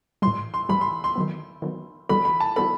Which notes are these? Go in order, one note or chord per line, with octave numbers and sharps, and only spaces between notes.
A2 E3 G3 C6
C6
A2 E3 G3 B5
C6
C6
D#3 F#3 B3
D#3 F#3 B3
E3 G3 B3 F#4 A4 B5
B5
A5
E3 G3 B3 F#4 A4 B5